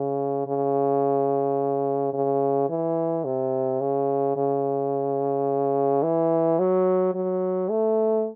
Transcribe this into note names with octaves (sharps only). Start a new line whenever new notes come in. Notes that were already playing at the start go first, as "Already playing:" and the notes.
Already playing: C#3
C#3
C#3
E3
C3
C#3
C#3
E3
F#3
F#3
A3